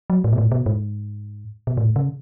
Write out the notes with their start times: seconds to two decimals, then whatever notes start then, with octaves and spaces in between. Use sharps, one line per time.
0.10 F#3
0.24 A2
0.33 B2
0.38 A2
0.52 B2
0.66 G#2
1.67 B2
1.77 A2
1.96 C#3